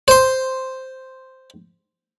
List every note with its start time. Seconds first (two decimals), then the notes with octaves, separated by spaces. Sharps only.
0.08 C5 C6